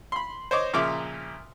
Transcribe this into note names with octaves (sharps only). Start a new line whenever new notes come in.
B5 C6
C5 C#5 D#5 D6
A#2 C#3 F3 E5 A#5 D6